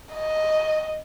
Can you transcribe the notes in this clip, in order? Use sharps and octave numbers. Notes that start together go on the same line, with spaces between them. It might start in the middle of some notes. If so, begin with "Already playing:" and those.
D#5